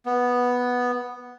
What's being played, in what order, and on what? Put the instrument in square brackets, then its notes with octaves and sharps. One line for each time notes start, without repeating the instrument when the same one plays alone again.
[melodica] B3